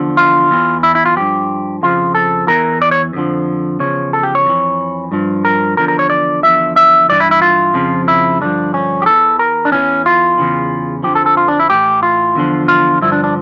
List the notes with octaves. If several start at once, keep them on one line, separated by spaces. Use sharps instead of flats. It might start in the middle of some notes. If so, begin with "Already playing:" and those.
Already playing: E2 D3 F3
F4
E2 E3
E4
E4
F4
G2 F3 G4
F2 C#3 F3 F4
A4
E2 E3 A#4
D5
C#5
F2 D3 F3
E2 C#3 F3 C#5
A4
G4
C#5
F2 E3
G2 F3
A#4
E2 D3 F3 A#4
A#4
C#5
D5
E2 D3 F3 E5
E5
G2 E3 D5
E4
E4
F4
F2 C#3 F3
E4
G2 D3 F3 D4
C#4
G4
E2 E3 A4
A#4
D4
E2 E3 C#4
F4
E2 C#3 E3
F2 D3 F3 G4
A4
A4
F4
D4
E4
A2 E3 G4
F4
E2 D3 F3
F4
G2 D3 F3 E4
D4
D4